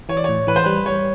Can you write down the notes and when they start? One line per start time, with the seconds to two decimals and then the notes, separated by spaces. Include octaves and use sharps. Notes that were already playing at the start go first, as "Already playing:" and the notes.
0.09 E3 C#5
0.17 D5
0.24 A2 C#5
0.47 E3 B4
0.56 C5
0.64 G3 B4
0.86 G3 C#5